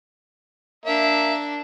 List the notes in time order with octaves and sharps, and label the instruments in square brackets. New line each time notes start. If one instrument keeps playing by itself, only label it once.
[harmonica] A#3 E5 [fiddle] D4